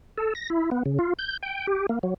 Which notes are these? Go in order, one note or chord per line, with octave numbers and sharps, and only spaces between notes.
A4
A#6
E4
B3
C#3
F4
G6
G5
G4
A#3
F#3